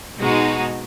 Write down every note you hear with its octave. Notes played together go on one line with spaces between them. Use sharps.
B2 G#3 D#4 F#4